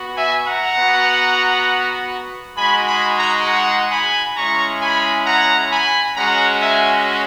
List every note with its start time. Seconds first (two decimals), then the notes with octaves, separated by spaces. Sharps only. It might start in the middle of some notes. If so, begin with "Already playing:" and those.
Already playing: B3 F#4
0.16 E5 G#5
0.46 F#5 A#5
0.76 B3 F#4
2.56 G#3 D#4 F#4 G#5 B5
2.86 G#5 B5
3.16 F#5 A#5
3.46 F#5 A#5
3.91 G#5 B5
4.36 G#3 C#4 E4 A#5 C#6
4.81 G#5 B5
5.26 F#5 A#5
5.71 G#5 B5
6.16 G#3 C#4 F#4 F#5 A#5
6.61 E5 G#5